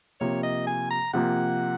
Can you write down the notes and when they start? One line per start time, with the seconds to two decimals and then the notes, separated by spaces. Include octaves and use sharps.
0.20 C3 F3 A#3 C#5
0.43 D#5
0.67 G#5
0.90 A#5
1.13 C3 F3 A#3 F#5